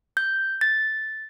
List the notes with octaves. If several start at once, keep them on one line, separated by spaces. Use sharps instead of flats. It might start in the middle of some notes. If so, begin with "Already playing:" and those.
G6
A6